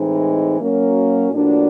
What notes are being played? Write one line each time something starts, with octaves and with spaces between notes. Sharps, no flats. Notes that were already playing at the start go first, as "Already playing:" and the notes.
Already playing: A2 E3 G#3 C4 D#4
F#3 A#3 C#4
A2 F3 A#3 D4 F#4